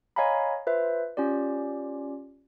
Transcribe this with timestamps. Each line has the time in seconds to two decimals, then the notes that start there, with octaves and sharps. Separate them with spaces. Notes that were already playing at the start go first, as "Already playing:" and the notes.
0.16 C#5 D#5 F5 G#5 A#5 B5
0.67 F4 B4 C5 E5
1.17 C#4 F4 G4 D5